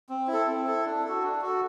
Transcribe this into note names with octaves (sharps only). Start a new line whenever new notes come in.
C4
E4
A4
C4
E4 A4
D4
F#4 A4
D4
F#4 A4